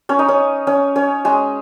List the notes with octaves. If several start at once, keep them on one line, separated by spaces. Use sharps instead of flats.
C#4 C#5
D#4 D#5
C#4 C#5
C#4 C#5
C#4 C#5
G#3 G#4